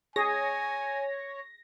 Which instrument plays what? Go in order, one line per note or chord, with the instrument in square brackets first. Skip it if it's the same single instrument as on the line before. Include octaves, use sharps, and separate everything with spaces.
[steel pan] G#4 [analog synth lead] C#5 [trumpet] G#5 [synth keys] A#6